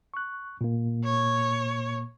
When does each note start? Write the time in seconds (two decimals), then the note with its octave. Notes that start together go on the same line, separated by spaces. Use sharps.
0.14 C#6 F#6
0.61 A#2 A#3
1.04 C#5